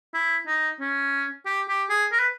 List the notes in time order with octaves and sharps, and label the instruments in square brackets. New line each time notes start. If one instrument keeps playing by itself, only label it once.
[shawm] E4
D#4
C#4
G4
G4
G#4
A#4
B4